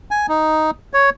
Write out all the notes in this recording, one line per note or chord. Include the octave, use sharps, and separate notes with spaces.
G#5
D#4
C#5